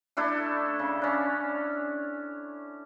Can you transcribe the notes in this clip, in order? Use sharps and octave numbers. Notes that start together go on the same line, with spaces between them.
A3 D4 E4 A4
C#3
C#4 D4